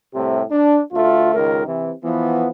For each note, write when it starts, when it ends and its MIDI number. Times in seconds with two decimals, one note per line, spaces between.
0.14 0.41 36
0.14 0.41 45
0.14 0.41 48
0.50 0.78 62
0.93 1.34 38
0.93 1.34 57
0.93 1.34 65
1.35 1.66 37
1.35 1.66 51
1.35 1.66 70
1.66 1.91 48
1.66 1.91 52
2.04 2.49 52
2.04 2.49 53
2.04 2.49 59